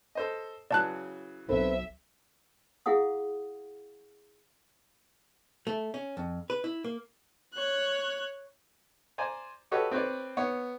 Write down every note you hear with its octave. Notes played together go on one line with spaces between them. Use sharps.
A4 C5 D#5
C#3 E3 F#3 D5 A5 F#6
B1 C4 A4 B4 E5
E4 G#4 F5 F#5 D#6
A3
C#4
F2
B4
E4
A#3
C#5 F#6
C5 D5 G#5 A#5
F#4 G4 A4 B4 C#5 D#5
C4 B4 C#5 D5
B3 C#5